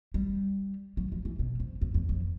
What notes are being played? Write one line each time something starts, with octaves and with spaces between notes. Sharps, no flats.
G3
F#3
F3
E3
B2
F2
F2
F2
F2